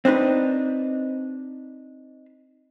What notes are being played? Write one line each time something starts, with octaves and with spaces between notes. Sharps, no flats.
C4 D4 D#4 B4